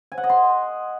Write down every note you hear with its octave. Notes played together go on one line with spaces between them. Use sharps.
G#5
F#5
D#5
C6